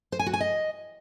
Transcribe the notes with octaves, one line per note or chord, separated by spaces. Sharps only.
C5
G#5
F#4
G#5
D#5